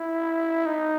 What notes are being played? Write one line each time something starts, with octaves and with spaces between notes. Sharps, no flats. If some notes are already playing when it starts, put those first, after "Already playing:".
Already playing: E4
D#4